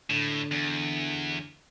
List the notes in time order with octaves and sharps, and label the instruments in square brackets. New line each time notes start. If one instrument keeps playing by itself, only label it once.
[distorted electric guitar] A2 [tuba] D3
[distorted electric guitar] E2